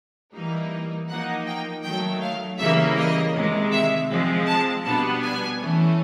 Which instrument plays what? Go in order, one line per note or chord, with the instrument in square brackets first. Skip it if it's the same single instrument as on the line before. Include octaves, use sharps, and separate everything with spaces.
[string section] E3 G3 A#3 D#4
F3 A#3 D#4 F#5
G5
D#3 F#3 A3 G5
F5
C#3 E3 G3 A#3 E5
D#5
C3 D#3 G#3
E5
F3 G#3 C4
A5
B2 G3 B3 D4 A5
G#5
E3 A3 C#4